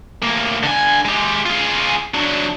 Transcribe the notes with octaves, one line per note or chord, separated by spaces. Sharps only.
D2 A#3
D3 G#5
G#3 G4
F4 G#4
F#3 D4